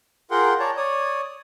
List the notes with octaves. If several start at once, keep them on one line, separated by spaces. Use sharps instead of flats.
F4 G#4 A#4 F#5 G5 C6
C#5 D5 A5 A#5
C#5 D5 D#6